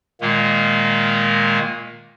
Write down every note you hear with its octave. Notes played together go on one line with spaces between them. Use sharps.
A#2 D#3 G#3 A#3